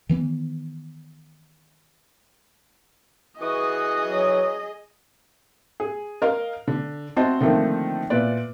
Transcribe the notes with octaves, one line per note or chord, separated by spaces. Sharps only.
D#3 E3 B3
E3 F#4 G#4 D#5 D#6
F#3
G#4
A#4 D#5 F5
D3
C4 F#4 C5 D#5 E5 A5
D3 D#3 F3 A3 A#3 C4
A#2 E4 B4 D5